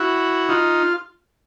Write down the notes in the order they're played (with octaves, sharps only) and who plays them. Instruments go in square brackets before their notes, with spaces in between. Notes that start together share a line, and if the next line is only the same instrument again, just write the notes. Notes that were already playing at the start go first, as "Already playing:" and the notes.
Already playing: [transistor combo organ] E4 F#4
D#4 F4